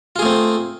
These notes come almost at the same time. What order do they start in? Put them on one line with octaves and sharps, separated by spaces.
F4 G#4 A3 C4